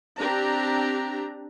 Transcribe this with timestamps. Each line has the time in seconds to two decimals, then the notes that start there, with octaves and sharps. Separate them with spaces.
0.19 C4 D4 G4 A#5